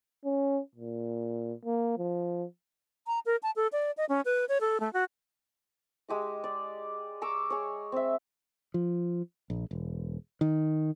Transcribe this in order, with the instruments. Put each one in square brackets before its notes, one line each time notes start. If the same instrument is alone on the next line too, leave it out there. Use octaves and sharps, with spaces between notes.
[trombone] C#4
A#2
A#3
F3
[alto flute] A#5
A#4
A5
A4
D5
D#5
C#4
B4
C#5
A4
A3
F#4
[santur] G#3 G4 D#5
D5
A#5 C#6 D6 E6
G#4 C#5
C4 E5
[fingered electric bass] F3
A#1
E1
D#3